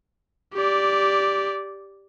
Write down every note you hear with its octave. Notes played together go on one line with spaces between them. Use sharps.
G4 D5